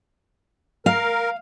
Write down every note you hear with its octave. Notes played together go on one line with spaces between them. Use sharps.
A#4 F5